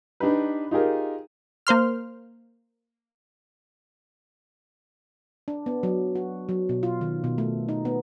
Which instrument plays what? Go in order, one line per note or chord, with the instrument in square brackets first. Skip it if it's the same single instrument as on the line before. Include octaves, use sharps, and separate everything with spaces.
[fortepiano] D4 D#4 G4 B4
D#4 F4 G4 G#4 A#4
[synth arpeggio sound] A#3 C5 C6 F6
[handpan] D4
B3
F#3
F#4
F#3
B2
F4
D#3
B2
A3
D#4
B3